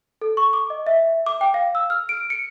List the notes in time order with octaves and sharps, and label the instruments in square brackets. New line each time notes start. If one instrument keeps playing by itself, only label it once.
[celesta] A4
C#6
D6
D#5
E5
D6
G5
F5
E6
F6
D7
C#7